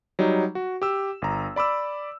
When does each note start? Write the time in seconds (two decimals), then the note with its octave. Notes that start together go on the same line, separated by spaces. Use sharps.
0.19 F#3 G3 D#4
0.55 F#4
0.82 G4 E6
1.22 G1 A#5
1.56 D5 B5 D6 E6